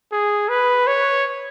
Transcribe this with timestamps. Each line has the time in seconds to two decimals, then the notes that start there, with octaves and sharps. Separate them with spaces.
0.12 G#4
0.49 B4
0.87 C#5